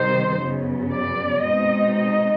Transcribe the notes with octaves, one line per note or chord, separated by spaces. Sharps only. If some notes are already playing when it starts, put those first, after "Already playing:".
Already playing: C3 D#3 G3 C4 D#4 C5
F#2 C#3 F#3 B3
D5
B2 G#3 C4 D#4 D#5
D#5